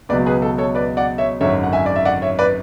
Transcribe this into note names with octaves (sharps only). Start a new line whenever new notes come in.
C#2 B2 F#3 B4 D5
G#4 B4
A4
A4 C#5
B4 D5
D5 F#5
C#5 E5
G#1 F#2 D3 C#5 E5
F#5
E5 G#5
D5
E5
D5 F#5
C#5 E5
B4 D5